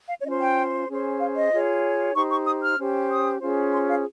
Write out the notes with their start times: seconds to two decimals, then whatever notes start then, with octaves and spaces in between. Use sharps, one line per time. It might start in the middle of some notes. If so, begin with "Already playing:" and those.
0.09 F5
0.19 C#5
0.24 C#4 F4 C5 D#5
0.40 G5
0.89 C#4 G#4 C5
1.20 F5
1.35 D#5
1.51 F4 G#4 C#5
2.14 D#4 G4 C5 C#6
2.31 C#6
2.46 D#6
2.63 F6
2.77 C#4 G4 C5
3.10 D#6
3.41 C#4 F4 G#4 C5
3.73 C6
3.88 F5